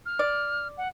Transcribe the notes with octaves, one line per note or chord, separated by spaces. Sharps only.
F6
D5
F#5